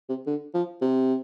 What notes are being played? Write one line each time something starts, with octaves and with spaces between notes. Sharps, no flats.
C3
D3
F3
C3